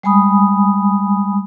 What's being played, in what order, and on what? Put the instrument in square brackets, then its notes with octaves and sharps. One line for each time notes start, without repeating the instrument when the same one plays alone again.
[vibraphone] G3 G#3 G#5 B5 D#6